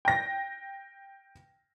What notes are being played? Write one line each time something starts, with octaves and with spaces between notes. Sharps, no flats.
G5 A#6